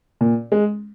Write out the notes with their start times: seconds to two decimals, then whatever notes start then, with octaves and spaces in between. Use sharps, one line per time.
0.21 A#2
0.52 G#3